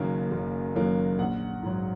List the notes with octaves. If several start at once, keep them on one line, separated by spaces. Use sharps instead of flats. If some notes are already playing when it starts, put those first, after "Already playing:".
Already playing: F#1 F#2 D#3 F#3 A#3
F#1
F#2 D#3 F#3 A#3
A#1 F#5
G#2 F#3